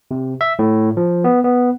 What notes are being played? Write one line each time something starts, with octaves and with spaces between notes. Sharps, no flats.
C3
E5
A2
F3
B3
B3